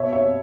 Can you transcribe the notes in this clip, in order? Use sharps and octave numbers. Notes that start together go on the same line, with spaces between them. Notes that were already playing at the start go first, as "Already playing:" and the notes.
Already playing: B2 C#5 E5
C#5 E5